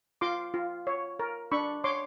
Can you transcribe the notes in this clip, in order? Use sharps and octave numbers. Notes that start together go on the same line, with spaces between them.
F4 C6 D6
F4
C#5
A#4
D4 B5 C#6
C#5 C6 D6